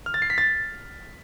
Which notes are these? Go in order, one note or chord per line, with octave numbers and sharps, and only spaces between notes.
F6
A6
C7
B6
A6